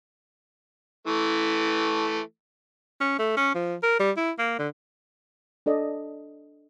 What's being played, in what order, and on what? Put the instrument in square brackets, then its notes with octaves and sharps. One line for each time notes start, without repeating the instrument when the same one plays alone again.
[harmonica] E3 A3
[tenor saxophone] C#4
A3
C#4
F3
A#4
G3
E4
A#3
D3
[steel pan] D4 A4 D5 D#5